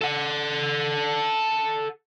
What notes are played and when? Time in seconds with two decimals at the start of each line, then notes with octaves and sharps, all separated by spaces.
0.01 A4 F#5